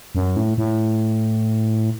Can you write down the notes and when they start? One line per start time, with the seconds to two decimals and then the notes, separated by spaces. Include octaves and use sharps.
0.15 F#2
0.36 A2
0.58 A2